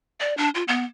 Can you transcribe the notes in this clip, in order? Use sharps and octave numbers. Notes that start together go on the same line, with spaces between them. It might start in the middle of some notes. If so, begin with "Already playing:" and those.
D5
D4
F4
B3